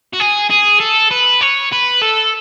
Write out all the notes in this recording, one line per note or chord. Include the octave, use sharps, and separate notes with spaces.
F#4
G#4
G#4
A4
B4
C#5
B4
A4